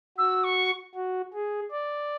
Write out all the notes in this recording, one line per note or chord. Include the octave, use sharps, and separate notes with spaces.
F#4 E6
C#6
F#4
G#4
D5